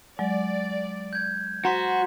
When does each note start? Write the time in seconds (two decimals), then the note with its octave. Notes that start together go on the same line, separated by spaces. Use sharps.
0.19 F#3 G#3 D5
1.13 G6 G#6
1.65 F#4 C5 F#5 A#5 C6 B6